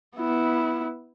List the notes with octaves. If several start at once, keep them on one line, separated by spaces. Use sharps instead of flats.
B3 E4